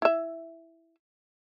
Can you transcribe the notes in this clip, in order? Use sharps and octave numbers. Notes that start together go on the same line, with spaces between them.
E4 E5